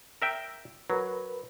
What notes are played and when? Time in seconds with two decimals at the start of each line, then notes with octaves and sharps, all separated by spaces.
0.22 A#4 E5 G5
0.90 F#3 A#4 B4